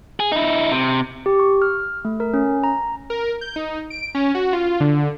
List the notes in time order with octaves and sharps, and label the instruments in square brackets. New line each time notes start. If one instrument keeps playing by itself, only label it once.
[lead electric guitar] G#4
D#4 E4
C3
[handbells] G4
C#6
F6
A3
A#4
C#4
A#5
[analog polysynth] A#4
G6
D#4
D7
C#4
F#4
F4
D3